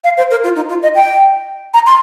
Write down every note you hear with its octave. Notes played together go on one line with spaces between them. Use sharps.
F5
C5
A#4
F4
D#4
F4
D#5
G5
A#5
C6